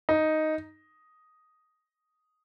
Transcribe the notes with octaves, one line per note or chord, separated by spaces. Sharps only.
D#4